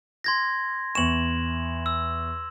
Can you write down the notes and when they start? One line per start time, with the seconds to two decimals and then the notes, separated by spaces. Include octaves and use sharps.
0.24 C6 G#6 A#6
0.95 E2 C#6 E7 F#7
1.86 E6